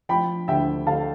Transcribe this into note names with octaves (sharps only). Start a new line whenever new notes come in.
F3 G5 B5
D2 E5 G5
D3 F5 A5